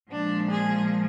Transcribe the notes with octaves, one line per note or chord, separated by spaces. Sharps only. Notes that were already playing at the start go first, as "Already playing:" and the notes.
A#2 F3 G#3 D4
G#4